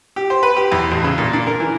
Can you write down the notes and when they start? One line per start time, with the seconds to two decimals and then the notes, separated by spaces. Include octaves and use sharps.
0.16 G4
0.30 C5
0.43 B4
0.56 G4
0.72 E2
0.91 A1
1.04 C#3
1.18 A#2
1.33 D4
1.47 A#4
1.60 E3